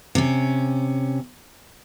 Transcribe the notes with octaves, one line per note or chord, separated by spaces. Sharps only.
C3 C#4